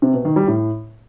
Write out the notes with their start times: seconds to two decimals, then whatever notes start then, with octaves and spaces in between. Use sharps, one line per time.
0.02 C3
0.14 B2
0.25 D#3
0.36 G3
0.48 A2